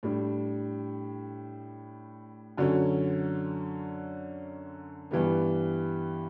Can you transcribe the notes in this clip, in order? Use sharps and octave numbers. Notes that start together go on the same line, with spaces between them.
A2 G3 D4
F#2 D3 F#3 C#4
G2 E3 G3 B3